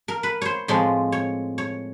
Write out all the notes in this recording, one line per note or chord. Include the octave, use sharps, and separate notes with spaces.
A#4
B4
C5 C#5
A2 F3 G#3 C4
C#5
C#5